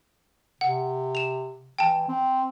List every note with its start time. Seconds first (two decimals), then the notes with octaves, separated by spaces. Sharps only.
0.61 C3 F#5
1.15 E7 F7
1.78 E3 G5 A5
2.09 C4